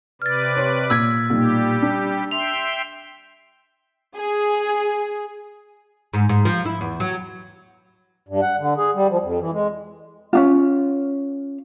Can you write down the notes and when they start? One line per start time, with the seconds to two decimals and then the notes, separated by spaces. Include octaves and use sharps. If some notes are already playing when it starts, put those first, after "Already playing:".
0.22 C3 B4 D5 F6 A6
0.56 C#5 C6
0.90 A#2 D6 E6 G#6 B6
1.30 B1 A#2 G3 G4
1.82 D4
2.31 E5 G5 C6 F7
4.15 G#4
6.14 G#2
6.29 G#2
6.45 F3
6.65 E4
6.81 E2
7.00 F#3
8.29 G2
8.42 F#5
8.59 D3
8.77 G#4
8.95 G3
9.10 F3
9.22 F2
9.40 E3
9.52 G#3
10.33 C#4 D4 F4